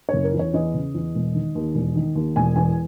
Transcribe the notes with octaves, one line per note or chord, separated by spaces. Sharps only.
F#1 C#5
A#4
E2
C#5
E2 D#5
C#3
E2
E1
D#3
D#2
E1
D#3
D#2
E1 G#5
E2 G#5